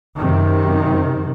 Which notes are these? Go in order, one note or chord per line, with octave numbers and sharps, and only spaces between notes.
F#2 C3 D#3